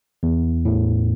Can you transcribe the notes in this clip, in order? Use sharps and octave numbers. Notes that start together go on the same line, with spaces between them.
E2
A2